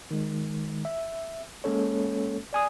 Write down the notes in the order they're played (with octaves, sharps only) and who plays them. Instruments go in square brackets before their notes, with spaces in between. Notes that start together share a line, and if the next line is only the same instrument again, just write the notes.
[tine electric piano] D#3 G#3
E5
G#3 A#3 C#4 A4 C#5
D5 G#5 D#6